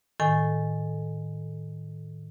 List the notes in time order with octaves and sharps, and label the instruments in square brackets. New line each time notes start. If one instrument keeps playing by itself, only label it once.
[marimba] A2 D#3 A4 G#5